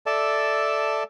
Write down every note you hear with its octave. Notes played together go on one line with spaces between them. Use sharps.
A4 D5 E5 A5